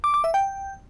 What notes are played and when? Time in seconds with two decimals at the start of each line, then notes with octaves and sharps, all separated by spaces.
0.04 D6
0.14 D6
0.24 E5
0.34 G5